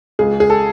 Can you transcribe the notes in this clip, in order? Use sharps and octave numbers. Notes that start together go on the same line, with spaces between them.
C#2 G#4
G#4
A4